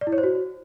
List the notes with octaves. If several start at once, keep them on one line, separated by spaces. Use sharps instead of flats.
D5
E4
C#5
C5
F#4